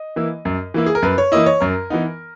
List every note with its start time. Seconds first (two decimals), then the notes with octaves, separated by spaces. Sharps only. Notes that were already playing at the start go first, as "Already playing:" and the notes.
Already playing: D#5
0.16 E3 A#3 E4
0.45 F#2
0.74 E3 A#3 E4
0.86 G#4
0.95 A#4
1.02 F#2 B4
1.18 C#5
1.32 E3 A#3 E4 D#5
1.46 C#5
1.60 F#2 A#4
1.90 E3 B3 D#4